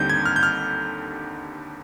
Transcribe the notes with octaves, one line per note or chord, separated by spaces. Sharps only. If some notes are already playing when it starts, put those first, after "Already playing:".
Already playing: D#2 D3 G3 C4 D#4 G6
G#6
F6
G6
F6